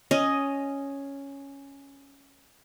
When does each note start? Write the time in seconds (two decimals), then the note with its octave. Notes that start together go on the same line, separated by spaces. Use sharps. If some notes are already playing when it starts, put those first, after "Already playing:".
0.11 C#4 D#5